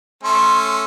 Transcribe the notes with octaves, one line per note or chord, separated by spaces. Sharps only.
A3 C#4 C6